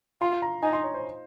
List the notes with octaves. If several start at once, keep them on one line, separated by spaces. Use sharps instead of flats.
F4 C6
A#5
D#4 G#5
C6
C#5
C5